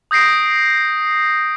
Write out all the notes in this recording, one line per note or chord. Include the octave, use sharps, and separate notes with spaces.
D#6 G6 A#6 C7 D7